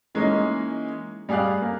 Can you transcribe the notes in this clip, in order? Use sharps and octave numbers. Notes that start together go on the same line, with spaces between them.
E3 G#3 A#3 C#4 D#4
G3 G#4 D5 F5 F#6
A#3